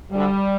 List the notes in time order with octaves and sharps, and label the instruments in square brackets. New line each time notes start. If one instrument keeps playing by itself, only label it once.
[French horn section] D2 D3 G3